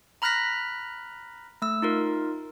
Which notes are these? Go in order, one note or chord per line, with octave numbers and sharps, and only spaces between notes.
A#5 B5 F6 F#6 A#6 B6
A3 E6
D#4 F4 A#4